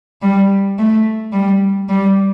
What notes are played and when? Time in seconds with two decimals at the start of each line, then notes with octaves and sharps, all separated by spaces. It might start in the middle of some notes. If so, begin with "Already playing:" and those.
0.22 G3
0.78 A3
1.33 G3
1.89 G3